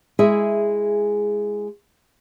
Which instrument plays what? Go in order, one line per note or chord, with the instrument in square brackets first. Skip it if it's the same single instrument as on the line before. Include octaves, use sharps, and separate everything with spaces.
[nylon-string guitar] G#3 E4 G#4 E5